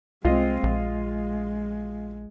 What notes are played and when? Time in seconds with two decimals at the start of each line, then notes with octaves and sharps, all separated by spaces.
0.25 C2 G#3 C4 F4 D#5
0.63 A#1 G#3